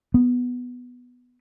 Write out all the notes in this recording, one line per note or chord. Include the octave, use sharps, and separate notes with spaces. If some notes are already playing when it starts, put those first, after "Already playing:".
B3